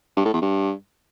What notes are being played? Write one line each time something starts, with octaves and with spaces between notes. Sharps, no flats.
G2
A2
E2
G2